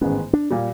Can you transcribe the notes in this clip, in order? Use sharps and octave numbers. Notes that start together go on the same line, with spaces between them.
A1 G#2 D#3 G#3 B3 C#4
D4
A#2 G3